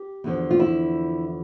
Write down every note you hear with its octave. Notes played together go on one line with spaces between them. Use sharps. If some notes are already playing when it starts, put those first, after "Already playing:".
Already playing: G4
E2 D3 F3
F4
E4